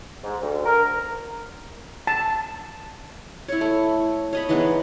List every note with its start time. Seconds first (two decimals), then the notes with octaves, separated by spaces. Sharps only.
0.23 G#2
0.42 D2
0.65 A#4
2.07 A5
3.48 E4 C#5
3.61 A3
4.33 C#5 D#5 B5
4.49 E3 G#3 B3 D#4